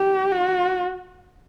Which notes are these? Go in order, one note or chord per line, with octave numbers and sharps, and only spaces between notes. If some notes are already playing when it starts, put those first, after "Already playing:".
Already playing: G4
F#4